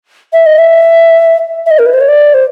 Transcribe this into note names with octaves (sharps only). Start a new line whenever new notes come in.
E5
D#5
E5
E5
D#5
A#4
B4
C5
C#5
D5
C5